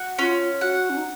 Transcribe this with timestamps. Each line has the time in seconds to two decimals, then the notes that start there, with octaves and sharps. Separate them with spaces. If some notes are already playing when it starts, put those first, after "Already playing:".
Already playing: F#4
0.19 C#4 F4
0.61 F#4 F#5
0.90 C#4
0.97 D#4